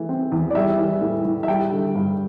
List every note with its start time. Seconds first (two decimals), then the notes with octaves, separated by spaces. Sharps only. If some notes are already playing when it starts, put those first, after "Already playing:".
Already playing: E3 A3
0.09 C4
0.32 E2
0.50 D5
0.55 G3 E5
0.78 E3
1.02 A2
1.25 A2
1.43 E5
1.48 G3 G5
1.72 D3
1.95 G2